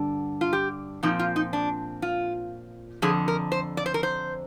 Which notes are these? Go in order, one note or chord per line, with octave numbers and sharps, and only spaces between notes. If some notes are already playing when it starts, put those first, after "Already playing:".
Already playing: G2 D3 D4
F4
G4
A#2 F3 C4 D#4
F4
D#4
D4
F4
F2 D3 F3 G#4
A#4
C5
D5
C5
A#4
C5